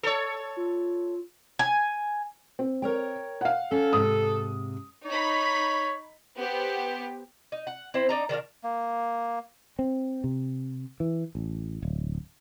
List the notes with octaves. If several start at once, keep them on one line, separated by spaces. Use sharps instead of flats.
A4 C#5
F4
G#5
C4
A#4 C#5 G5
F5 F#5
C#4 A4
G#2 C3 D#6
D#4 C#5 B5
B3 G4 C5
D#4
F#5
C4 E4 C5
D4 D#4 A#5
D#3 D4 A#4 F5
A#3
C4
C3
E3
A1
D1